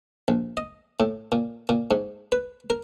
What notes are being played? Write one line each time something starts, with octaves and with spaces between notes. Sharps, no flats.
A#1
D#5
A2
A#2
A#2
G#2
B4
A#4